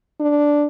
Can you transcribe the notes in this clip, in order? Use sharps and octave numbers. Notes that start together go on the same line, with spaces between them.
D4